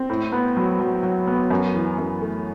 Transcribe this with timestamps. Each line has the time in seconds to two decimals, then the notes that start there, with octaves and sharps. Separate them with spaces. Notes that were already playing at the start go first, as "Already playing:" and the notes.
Already playing: C4
0.10 A2
0.32 B3
0.57 F#3
0.80 F#3
1.03 F#3
1.27 B3
1.50 F#2
1.74 E3
1.98 F#2
2.21 A3